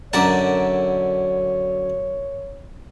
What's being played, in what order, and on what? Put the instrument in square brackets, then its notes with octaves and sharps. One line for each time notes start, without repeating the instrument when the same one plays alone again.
[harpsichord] F#2 D3 A5 [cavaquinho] A#4 D5 A#5 [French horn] C#5